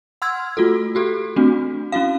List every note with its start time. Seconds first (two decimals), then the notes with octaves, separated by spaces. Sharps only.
0.22 F#5 C6 E6 F6 G#6
0.57 A3 F4 F#4 A4
0.95 F#4 G4 A4
1.36 A3 C4 D4 F#4
1.92 C#4 E4 F#4 F5